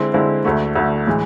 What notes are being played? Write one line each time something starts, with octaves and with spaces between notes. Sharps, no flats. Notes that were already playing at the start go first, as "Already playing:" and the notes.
Already playing: D3 G#3 C4 E4
D3 G#3 C4 E4
D2 D3 A3
D2 D3 A3
A2 E3 G#3